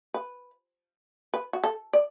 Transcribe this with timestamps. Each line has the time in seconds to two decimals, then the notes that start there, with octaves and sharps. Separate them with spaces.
0.14 B4
1.34 B4
1.53 F#4
1.64 A4
1.93 D5